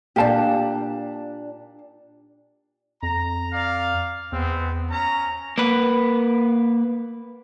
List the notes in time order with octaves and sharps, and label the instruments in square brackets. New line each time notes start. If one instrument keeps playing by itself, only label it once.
[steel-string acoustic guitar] A#2 D4 [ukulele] G4 F5 A5
[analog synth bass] F2 [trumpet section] A#5
[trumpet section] D5 F5
[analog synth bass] E2 [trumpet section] G#3 B3 C4
[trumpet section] C#4 A#5
[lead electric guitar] A#3 B4